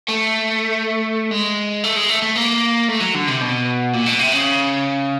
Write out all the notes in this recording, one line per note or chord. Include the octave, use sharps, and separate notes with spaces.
A3
G#3
A3
G#3
A3
A3
A#3
A3
F#3
D3
C3
B2
A#2
B2
C3
C#3